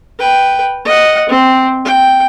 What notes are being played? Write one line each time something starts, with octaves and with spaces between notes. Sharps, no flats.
B4 G5
D#5 F#5
C4
G5